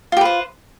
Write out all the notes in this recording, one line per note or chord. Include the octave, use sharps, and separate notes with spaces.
F4 G4 B4 C5